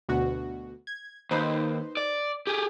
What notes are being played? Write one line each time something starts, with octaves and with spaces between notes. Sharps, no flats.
D2 B2 F#4
G#6
D#2 D#4 B4 C5
D5
G4 G#4